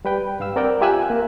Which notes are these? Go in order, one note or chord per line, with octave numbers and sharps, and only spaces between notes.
G3 B4 G5
G2 F5 E6
C4 A#4 D5 F#5 G5
F4 G4 E5 G#5 E6 F#6
A#3